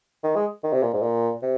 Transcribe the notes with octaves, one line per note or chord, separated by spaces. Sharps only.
D#3
G#3
D#3
C3
A#2
G#2
A#2
C3